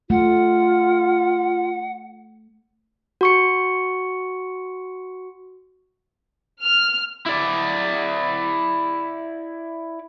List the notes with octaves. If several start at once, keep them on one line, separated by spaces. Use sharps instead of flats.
A3 F4 F#5
F#4 C#6 C#7
F6
E4 D5